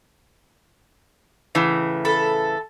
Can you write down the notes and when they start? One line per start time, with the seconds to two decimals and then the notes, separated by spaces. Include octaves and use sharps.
1.55 A2 C#3 E3
2.05 A4 B5